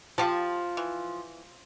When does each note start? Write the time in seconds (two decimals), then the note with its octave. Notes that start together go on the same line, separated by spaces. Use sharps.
0.18 F3 F4 G4 A5
0.77 E3